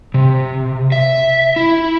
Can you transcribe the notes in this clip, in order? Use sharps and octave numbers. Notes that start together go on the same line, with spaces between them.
C3
E5
E4